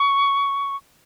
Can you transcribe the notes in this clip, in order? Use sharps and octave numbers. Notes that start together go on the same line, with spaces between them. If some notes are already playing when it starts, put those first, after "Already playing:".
Already playing: C#6